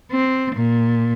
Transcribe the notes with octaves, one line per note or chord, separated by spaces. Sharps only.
C4
A#2